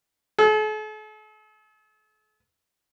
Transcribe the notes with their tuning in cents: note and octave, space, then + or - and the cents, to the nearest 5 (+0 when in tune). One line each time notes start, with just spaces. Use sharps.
A4 -45